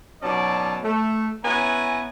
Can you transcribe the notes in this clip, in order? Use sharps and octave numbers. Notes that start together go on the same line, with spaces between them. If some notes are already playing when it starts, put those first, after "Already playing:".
B2 F#3 C#4 D#4 D5 A5
A3
B3 C#4 E4 G#5 A#5